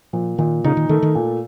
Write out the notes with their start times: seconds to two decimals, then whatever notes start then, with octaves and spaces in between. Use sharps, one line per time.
0.13 A#2 F3
0.38 A#2 D#3
0.64 C#3 D#4
0.77 D#3
0.89 D#3 A3
1.02 D#3
1.15 A#2